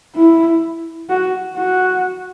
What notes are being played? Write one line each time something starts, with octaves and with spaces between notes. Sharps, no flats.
E4
F#4
F#4